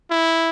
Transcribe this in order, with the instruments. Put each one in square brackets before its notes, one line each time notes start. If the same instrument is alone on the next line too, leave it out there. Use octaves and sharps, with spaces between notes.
[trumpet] E4